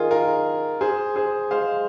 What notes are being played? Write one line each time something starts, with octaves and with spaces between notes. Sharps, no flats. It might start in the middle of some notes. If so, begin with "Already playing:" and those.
Already playing: D#3 F4 G#4
F4 A#4
G#4 C5
G#4 C5
G#3 C5 F5